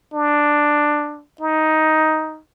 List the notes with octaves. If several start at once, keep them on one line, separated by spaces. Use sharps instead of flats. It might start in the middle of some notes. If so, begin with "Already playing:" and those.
D4
D#4